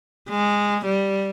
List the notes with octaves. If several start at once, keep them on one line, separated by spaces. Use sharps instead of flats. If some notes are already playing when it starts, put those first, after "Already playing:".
G#3
G3